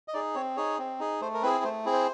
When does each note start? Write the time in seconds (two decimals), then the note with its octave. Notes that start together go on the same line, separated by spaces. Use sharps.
0.08 D#5
0.14 D#4 G#4 D5
0.35 C4 C#5
0.57 D#4 G#4 C#5
0.79 C4
0.99 D#4 G#4
1.21 A3 C5
1.34 A#4
1.42 C4 E4 G#4 B4
1.64 A3 C5
1.85 C4 E4 G#4
1.93 C5